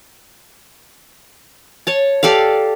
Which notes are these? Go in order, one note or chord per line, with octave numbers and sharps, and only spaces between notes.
C#5 A5
G4 A4 D5 F5